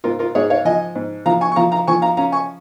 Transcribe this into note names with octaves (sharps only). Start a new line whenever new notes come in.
G#2 F4 A#4
F4 A#4
G#2 G#4 C#5
C#5 F5
F3 D#5 G#5
G#2
F3 F5 A#5
G#5 C#6
C#6
F3 F5 A#5
F5 A#5
F3 G#5 C#6
F5 A#5
C#4 F5 A#5
G#5 C#6